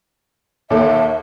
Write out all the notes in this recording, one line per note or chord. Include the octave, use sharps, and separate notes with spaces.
D#2 A4 E5